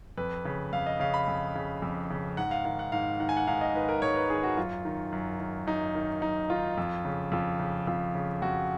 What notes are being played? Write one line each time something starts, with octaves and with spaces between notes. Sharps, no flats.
F2 B4
C#3
F2 F5
D#5
C#3 F5
B5
F2
C#3
F2
C#3
G#2 F#5
F5
D#3 F5
F#5
G#2 F5
D#3 F#5
G#5
F#5
G#2 F5
D#5
D#3 B4
A#4
G#2 C#5
B4
D#3 G#4
F#4
F#2 F4
D#3
F#2
D#3
F#2 D#4
D#3
F#2 D#4
D#3 F4
F2
C#3
F2 F4
C#3
F2 F4
C#3
F2 F#4